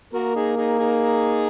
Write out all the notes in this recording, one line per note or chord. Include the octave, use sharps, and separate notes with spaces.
A#3 F#4 A#4
D#4 G#4
D#4 G#4
D#4 G#4